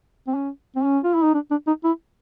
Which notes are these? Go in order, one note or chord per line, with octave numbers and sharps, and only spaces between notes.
C4
C#4
C4
C#4
F4
E4
D#4
D4
D4
D#4
E4